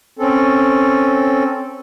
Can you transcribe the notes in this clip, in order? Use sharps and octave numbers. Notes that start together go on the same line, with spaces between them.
C4 C#4 A4